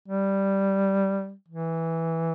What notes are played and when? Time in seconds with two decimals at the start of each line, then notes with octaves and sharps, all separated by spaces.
0.08 G3
1.48 E3